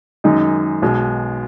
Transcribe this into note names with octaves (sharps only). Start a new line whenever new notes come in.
F#2 D#3 G#3 D#4
B1 B2 G#3